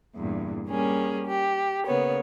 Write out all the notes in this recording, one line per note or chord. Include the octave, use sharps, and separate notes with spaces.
E2 G2 A#2
G3 A#3 C#4 G#4
G4
C#3 A#3 B3 C#5